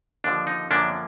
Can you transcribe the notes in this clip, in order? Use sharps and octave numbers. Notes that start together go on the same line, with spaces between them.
D#2 D3 F3 D4
D#4
F#2 D3 F3 A#3 C#4 D4